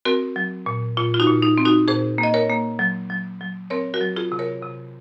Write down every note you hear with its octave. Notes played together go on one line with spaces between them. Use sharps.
C4 F#4 A#4
F#3
A#2
A#2 F4
F4
D#4 F#4
A#2
D#4
C4
D#4 F#4
A#2 G#4 C5
A#3
D#5
A#4 C#5
A#3
F#3
F#3
F#3
C4 A#4 C#5
F#4 A#4
F#3
F4 G#4
C3
A#4 C#5
C3